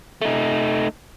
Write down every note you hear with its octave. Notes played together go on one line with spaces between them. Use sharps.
A3 D#4